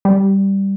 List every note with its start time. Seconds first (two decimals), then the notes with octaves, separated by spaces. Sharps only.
0.05 G3